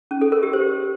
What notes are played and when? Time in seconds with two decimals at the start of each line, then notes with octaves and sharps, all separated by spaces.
0.11 C#4
0.21 A4
0.32 A#4
0.43 G4
0.53 C5